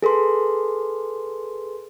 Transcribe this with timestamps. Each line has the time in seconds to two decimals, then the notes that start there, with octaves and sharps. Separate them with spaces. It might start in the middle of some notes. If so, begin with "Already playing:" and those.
0.03 G#4 A4 B4 C6